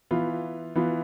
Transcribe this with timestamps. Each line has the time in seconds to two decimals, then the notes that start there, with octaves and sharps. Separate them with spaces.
0.11 E3 B3 F4
0.75 E3 B3 F4